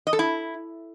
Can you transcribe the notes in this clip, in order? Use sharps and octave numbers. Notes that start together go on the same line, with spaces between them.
D#5
A4
E4